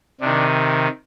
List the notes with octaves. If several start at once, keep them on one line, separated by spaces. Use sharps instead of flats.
C3 D#3 D4